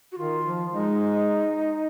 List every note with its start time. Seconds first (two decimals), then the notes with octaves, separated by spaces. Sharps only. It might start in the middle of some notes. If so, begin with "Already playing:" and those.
0.12 F#4
0.18 D#3 F4
0.45 F3
0.72 G#3 D#4